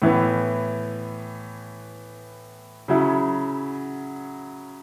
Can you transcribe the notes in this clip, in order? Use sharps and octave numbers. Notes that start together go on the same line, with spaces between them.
A2 E3 B3
C#3 F#3 C#4 E4